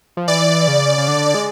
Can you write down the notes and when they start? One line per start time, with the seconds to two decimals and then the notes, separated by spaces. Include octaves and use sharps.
0.17 F3
0.28 E3 D5
0.68 C#3
0.98 C#3
1.08 D3
1.34 G#3